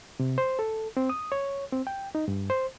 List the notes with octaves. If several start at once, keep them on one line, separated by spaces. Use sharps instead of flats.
C3
C5
A4
C4
D#6
C#5
C4
G5
D#4
G2
C5